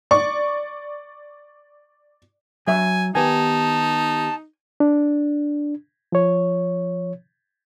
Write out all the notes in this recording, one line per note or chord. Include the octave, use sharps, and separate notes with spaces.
D5 C#6
F#3 E5 G#5
D#3 B3 D#4 G4 G#5 A5
D4
F3 C#5